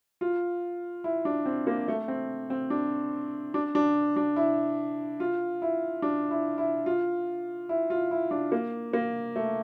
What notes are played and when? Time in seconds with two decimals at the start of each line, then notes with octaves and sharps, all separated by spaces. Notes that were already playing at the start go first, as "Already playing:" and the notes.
0.21 F4
1.04 E4
1.25 D4
1.46 C4
1.67 A#3
1.88 A3
2.08 C4
2.50 C4
2.70 D4
3.54 D4
3.75 D4
4.16 D4
4.36 E4
5.20 F4
5.62 E4
6.02 D4
6.31 E4
6.58 E4
6.86 F4
7.69 E4
7.90 F4
8.11 E4
8.31 D4
8.52 A#3
8.93 A#3
9.36 A3